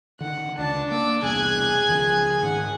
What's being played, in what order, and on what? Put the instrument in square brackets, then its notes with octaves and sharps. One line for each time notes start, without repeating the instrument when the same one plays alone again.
[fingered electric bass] D3 D#3 [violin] F#5
[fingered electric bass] C#2 [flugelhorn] D4 [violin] A5
[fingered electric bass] A#3 [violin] D6 E6
[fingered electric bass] E1 C2 [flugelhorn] G#4 [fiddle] G#5 [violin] F#6 G#6
[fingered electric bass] C#2 D#3 F3
[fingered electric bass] G#2 D#3 [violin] F#5